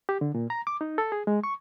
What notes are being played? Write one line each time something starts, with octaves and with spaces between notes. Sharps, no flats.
G4
D3
A#2
A#5
D6
D#4
A4
G#4
G#3
C#6